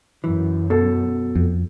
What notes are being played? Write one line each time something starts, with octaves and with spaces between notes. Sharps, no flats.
F#2 E3
B2 A4
F2